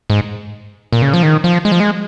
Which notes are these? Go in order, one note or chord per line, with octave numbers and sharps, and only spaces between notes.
G#2
A#2
C#3
F3
D#3
F3
G#3
F3
G#3